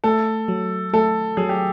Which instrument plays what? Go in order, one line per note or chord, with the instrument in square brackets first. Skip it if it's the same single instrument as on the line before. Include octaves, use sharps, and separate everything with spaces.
[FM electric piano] A3 [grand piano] A4
[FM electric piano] F#3
[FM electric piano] A3 [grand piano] A4
[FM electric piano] F#3 [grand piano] G#4
[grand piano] G4